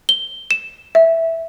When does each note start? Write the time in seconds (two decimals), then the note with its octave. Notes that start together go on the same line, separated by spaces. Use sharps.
0.09 G7
0.51 E7
0.95 E5